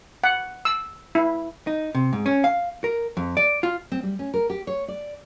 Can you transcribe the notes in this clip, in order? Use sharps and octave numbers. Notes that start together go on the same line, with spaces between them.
F#5
E6
E4
D#4
C3
G#2
C#4
F5
A#4
F2
D5
F4
C4
G3
C#4
A#4
G4
C#5
D5